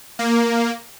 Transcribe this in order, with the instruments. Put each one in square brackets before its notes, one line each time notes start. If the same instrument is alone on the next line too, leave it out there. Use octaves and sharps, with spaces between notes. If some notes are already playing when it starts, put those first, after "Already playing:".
[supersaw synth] A#3